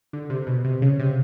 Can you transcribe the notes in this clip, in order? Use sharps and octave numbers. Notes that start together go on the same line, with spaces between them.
D3
C3
B2
C3
C#3
C3